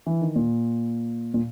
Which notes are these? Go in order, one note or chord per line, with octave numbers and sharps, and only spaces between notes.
E3
D#3
A#2
A#2